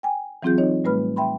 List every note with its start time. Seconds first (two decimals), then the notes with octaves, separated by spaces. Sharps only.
0.03 G5 G#5
0.43 E3 F#3 C4 F4 G#4 G6
0.58 D#4 C#5 D#5
0.84 A2 G3 A3 B4 B5 F6
1.16 E5 G5 B5 C6